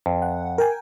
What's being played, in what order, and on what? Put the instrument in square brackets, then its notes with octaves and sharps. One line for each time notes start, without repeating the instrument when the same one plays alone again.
[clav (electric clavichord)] F2
[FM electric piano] F#5
A#4 G5 G#5